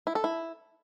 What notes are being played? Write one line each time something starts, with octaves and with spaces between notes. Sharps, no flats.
E4
A4
E4